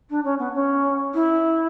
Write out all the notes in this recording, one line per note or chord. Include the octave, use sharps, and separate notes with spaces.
D4
C#4
B3
C#4
E4